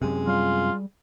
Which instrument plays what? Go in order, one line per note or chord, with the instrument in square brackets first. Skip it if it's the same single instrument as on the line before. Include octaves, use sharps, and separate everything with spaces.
[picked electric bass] F#2 C3 [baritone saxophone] G#3
[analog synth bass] G3 [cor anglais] F4